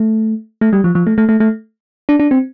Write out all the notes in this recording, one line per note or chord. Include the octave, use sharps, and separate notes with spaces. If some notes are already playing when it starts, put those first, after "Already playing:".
Already playing: A3
A3
G3
F3
F3
A3
A3
A3
A3
D4
D4
C4